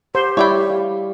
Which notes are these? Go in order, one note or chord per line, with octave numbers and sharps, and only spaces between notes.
G4 C5
G3 E4 C#5 D5 G5
F5